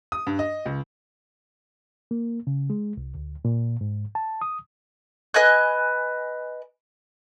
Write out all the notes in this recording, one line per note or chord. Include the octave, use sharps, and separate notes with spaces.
D#6
G2
D#5
C#2
A#3
C#3
G#3
C2
D2
A#2
G#2
A5
D#6
B4 D#5 G#5 F#6